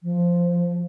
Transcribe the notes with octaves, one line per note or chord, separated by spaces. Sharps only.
F3